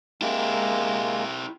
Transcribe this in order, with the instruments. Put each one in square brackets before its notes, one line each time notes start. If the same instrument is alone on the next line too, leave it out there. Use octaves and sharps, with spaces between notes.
[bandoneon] G#3 A#3 [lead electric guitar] E4 G4